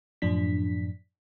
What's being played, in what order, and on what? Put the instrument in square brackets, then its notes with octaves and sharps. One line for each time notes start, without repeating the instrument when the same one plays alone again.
[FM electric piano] F#2 A2 F3 D4 B6